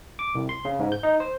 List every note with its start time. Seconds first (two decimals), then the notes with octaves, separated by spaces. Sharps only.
0.19 D6
0.35 C2
0.49 C6
0.65 C#3
0.79 G#2
0.92 G6
1.03 D#4
1.20 C5